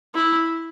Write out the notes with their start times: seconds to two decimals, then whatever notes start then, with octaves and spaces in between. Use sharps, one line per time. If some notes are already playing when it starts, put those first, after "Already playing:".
0.15 E4